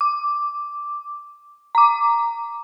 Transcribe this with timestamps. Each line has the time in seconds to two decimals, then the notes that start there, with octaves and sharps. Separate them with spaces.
0.01 D6
1.75 A#5 D6